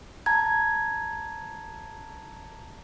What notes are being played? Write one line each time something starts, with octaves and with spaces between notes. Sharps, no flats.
A5 A#5 G#6